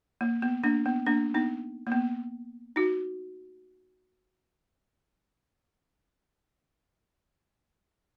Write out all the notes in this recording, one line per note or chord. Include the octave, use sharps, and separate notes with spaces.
A#3
B3
A#3 D4
B3
A#3 D4
B3 D#4
A#3
B3
D#4 F#4